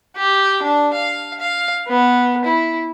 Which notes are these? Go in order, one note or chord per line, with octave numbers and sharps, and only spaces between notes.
G4
D4
F5
F5
B3
E4